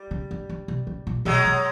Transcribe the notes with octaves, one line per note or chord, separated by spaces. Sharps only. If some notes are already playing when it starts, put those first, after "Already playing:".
Already playing: G3
C#3
D3
D3
C3
C#3
A#2
B2 F#3 G#3
C3